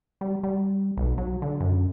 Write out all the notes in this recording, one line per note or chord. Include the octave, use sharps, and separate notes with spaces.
G3
G3
B1
F#3
D3
F#2